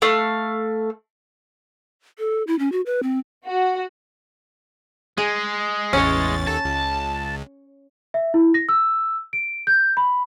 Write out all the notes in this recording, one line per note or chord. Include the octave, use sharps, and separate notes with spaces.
A3 F5
A4
E4
C#4
F#4
B4
C4
F#4
G#3 G#4
A1 E2 C#4 C#5 A6
D#2 A4 A5
C#2
E5
E4
A#6
E6
D7
G6
B5